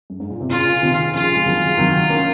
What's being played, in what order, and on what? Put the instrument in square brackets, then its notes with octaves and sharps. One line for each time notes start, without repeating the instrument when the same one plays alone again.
[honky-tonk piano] F#2
G#2
A#2
C3
[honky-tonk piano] A#2 C#3 [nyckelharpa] F4
[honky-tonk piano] C3 D#3
[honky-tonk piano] C#3 F3 [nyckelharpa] F4
[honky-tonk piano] G#3
D#3 F#3
D#3 F#3
A#3 C#4